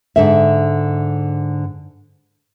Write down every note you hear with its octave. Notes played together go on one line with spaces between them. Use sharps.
G#2 D3 E5